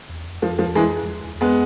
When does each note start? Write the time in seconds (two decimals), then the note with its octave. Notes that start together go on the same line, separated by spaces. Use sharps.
0.09 E2
0.27 F2
0.42 F2 F3
0.59 F3
0.68 E2
0.75 E3 G#3
0.91 F2
1.03 F2
1.08 E2
1.25 E2
1.35 E2
1.40 F2 G#3 B3